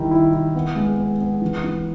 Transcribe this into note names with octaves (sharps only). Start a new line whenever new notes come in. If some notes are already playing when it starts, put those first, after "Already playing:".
Already playing: D#3 G3 E4
E4
E4
B3
G#3
B3
B3
E3
E3